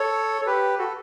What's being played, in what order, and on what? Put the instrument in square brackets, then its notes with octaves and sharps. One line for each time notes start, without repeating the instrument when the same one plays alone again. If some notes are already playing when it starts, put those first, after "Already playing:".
Already playing: [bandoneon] A4 C#5
A4
G4 B4
F#4 A4